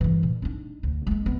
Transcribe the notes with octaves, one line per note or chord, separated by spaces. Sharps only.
G2 E3
A#2
D4 D#4
D2
G#3 A#3
D2 B3